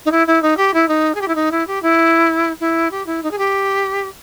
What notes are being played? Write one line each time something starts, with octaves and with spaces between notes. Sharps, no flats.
D#4
E4
E4
D#4
G4
E4
D#4
G#4
G4
E4
D#4
E4
G4
E4
E4
G4
E4
D#4
G#4
G4